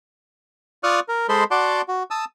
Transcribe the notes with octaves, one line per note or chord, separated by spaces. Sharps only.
F4 D5 C#6 D#6 F6 F#6
A#4
G#3 A4 C5 D#5 B5 C6
F#4 D5 F#5 A5 C6 D6
F#4
A5 D#6 E6